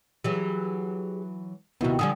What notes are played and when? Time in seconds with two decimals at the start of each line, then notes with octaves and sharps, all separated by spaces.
0.24 E3 F#3 G4 G#4
1.81 D#2 C3 B3 E4 F#4
1.99 D3 F3 G3 G#5 D#6